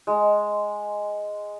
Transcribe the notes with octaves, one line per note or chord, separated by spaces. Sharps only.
G#3